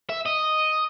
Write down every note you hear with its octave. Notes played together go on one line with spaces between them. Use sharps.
E5
D#5